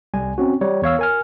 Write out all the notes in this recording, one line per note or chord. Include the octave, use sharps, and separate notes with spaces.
C2 G3 G#5
C4 C#4 F#4
G3 C#5
E2 C#5 F5 E6
A#4 G#5 F6